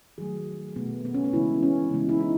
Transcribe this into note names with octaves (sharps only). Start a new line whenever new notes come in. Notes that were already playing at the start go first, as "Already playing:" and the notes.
D#3 F#3 A3 G#4
B2 A3 B3
B3
C#4
C#4
C#3 E3 G#3 B3 E4
C#4
C#3 E3 G#3 B3
E4
D#4